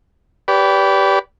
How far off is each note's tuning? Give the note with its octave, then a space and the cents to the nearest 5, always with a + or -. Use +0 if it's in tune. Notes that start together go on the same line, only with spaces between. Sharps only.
G4 -5 B4 +0 D5 -35